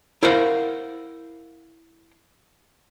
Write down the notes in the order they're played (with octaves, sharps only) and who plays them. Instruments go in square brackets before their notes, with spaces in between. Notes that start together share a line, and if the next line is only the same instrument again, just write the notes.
[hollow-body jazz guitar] E4 A#4 C5 F5 F#5